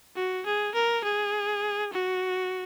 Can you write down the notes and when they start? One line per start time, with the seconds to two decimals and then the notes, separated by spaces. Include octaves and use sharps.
0.16 F#4
0.46 G#4
0.74 A#4
1.04 G#4
1.93 F#4